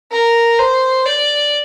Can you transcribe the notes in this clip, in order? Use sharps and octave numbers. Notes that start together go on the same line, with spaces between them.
A#4
C5
D5